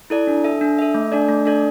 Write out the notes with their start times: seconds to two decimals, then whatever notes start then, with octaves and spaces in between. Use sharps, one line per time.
0.10 E4 A4 D5
0.27 D4
0.44 A4 E5
0.61 D4
0.79 A4 E5
0.94 A3
1.12 D4 A4 D5
1.29 A3
1.46 D4 A4 D5